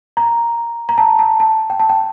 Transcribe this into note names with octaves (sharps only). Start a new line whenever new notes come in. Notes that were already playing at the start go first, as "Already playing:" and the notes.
A#5
A#5
A5
A5
A5
G5
A5
G5